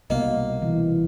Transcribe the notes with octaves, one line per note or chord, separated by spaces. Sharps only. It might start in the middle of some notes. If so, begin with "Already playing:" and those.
C2 B2 A#3 D#5
E3